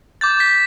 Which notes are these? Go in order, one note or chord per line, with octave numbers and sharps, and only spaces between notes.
D6 G6 A6
B6